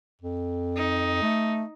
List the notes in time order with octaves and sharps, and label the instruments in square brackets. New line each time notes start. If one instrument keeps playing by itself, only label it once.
[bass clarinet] F2
[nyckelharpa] D#4
[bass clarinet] A3